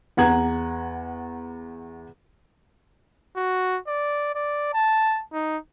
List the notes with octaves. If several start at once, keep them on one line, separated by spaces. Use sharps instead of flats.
E2 F#5 A#5 G#6 F#7
F#4
D5
D5
A5
D#4